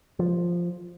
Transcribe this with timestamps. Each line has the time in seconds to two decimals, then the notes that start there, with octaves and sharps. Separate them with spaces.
0.19 F3